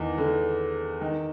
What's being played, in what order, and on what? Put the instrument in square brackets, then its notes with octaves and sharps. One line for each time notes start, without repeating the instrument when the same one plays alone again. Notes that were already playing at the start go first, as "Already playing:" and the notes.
Already playing: [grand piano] E2 D#3 E3
D3
D#3